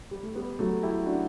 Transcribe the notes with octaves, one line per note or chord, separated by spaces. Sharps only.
G3
A3
G3 B3
F#3 A3
E4 G4
D4 F#4